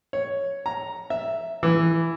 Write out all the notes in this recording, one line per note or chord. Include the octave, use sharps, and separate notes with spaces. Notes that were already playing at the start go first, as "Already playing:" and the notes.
C#5
A#5
E5
E3